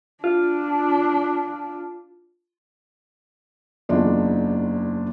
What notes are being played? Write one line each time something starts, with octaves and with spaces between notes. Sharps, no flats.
D4 F4
F#1 E2 D4 F4